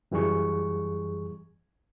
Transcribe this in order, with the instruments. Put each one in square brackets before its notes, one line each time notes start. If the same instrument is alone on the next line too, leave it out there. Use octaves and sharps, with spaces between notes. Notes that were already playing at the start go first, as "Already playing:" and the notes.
[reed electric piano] F#2 E3 G3 G#4 C#6